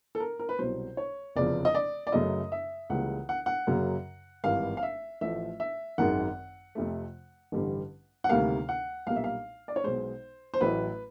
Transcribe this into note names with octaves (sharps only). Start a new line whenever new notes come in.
A4
A#4
A#4
B4
C2 B2 F#3 C5
C#5
F1 E2 C#3 F3 D5
D#5
D5
D5
F#2 C#3 F#3 A3 D#5
E5
C#2 C#3 E3 G3 A#3 F#5
F#5
F#5
F#2 C#3 F#3 A#3
G#1 G2 E3 F5
F5
E5
A1 A2 F3 A3 E5
E5
G#1 F#2 D#3 G#3 F#5
F2 C3 F3 A3
A1 G2 D3 G3
F#5
D2 C3 D#3 G3 A#3 F5
F#5
B1 A#2 G3 A#3 F5
E5
F5
D5
C#5
B1 B2 G#3 C5
C5
A1 A2 F#3 A3 B4